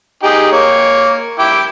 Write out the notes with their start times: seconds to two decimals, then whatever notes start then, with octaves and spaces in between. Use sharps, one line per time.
0.23 D#4 G4 G#4
0.52 A#3 C#5
1.39 E4 G5 D6